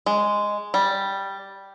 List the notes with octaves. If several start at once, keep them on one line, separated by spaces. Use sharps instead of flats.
G#3
G3